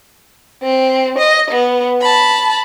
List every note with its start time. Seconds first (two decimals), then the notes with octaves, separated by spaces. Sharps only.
0.63 C4
1.18 D#5
1.51 B3
2.01 A5 B5